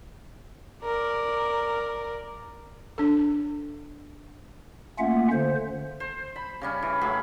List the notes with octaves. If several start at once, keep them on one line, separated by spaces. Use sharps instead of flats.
A#4 D5
D4 A4
A3 A#3 C#4 F4 E5 F#5
D3 C5
C5
B5
C#3 G3 C#4
E3
A2 F#3 G#4 B5